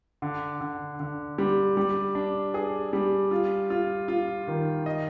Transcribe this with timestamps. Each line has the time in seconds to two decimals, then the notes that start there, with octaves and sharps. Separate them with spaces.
0.22 D3
0.61 D3
1.00 D3
1.38 G3
1.77 G3
2.15 D4
2.54 G#4
2.93 G3
3.31 F4
3.70 F4
4.08 F4
4.48 D#3
4.86 D#5